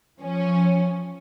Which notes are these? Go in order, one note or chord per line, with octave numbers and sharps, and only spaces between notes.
F3 C#4